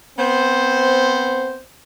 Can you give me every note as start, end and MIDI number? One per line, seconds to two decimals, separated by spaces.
0.18 1.60 59
0.18 1.60 60
0.18 1.60 72